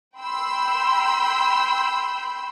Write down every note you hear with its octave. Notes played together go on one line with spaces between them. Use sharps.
G5 B5 C6 E6 G6